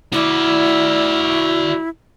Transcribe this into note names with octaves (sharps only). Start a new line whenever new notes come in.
E4 F#4 D5